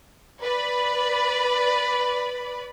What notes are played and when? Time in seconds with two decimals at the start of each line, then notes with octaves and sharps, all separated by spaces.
0.40 B4 D5 B5